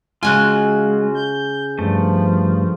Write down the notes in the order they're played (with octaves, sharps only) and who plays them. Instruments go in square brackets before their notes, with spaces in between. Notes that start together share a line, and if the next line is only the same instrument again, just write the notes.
[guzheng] C#3 C#4 G#5 [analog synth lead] G#3 [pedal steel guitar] F4 F#4 F#6
[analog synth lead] G6
[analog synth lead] G2 [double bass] F3 [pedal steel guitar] A3